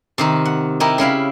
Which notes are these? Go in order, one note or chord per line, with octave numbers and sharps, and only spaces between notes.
C3 D#3 D#4
F#5
D#4 E4 G4 A#4
C#3 E4 F5 B5